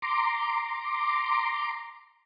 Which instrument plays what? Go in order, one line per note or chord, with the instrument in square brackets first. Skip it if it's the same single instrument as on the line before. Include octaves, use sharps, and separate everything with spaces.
[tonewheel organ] A#5 C6 D6